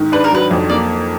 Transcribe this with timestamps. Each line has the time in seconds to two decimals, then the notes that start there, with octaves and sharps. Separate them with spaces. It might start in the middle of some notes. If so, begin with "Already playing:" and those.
Already playing: G#2 D#3
0.12 D4 B4
0.24 A#4
0.32 F#3 B4
0.51 F2
0.70 A#3 D5